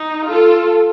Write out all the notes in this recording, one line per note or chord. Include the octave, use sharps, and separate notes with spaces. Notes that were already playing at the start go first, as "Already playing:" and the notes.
Already playing: D#4
F4 A4